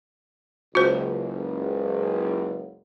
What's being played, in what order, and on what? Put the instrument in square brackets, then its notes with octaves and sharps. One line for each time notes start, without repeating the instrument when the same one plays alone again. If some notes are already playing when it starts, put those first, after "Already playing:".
[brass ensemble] F#1 C#2 [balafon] F#4 C5